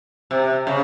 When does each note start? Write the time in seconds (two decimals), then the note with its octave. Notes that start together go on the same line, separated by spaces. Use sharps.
0.31 C3
0.67 C#3